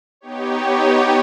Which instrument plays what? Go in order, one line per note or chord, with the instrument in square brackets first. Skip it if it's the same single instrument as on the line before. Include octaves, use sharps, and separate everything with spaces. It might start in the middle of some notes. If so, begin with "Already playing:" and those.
[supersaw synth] B3 D#4 G4 C#5